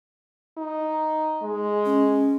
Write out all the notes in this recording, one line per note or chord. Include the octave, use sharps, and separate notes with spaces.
D#4
G#3
C#4